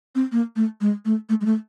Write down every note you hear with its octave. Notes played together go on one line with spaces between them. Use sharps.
C4
A#3
A3
G#3
A3
A3
G#3
A3